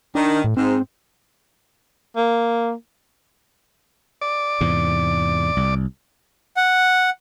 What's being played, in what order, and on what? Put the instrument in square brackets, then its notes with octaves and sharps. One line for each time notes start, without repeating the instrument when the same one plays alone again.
[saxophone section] D#3 [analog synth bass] D4
[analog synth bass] A2
[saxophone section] G#2 [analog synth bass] C4
[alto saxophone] A#3
[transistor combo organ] D5
[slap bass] E2 G#2 C3
C2
[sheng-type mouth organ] F#5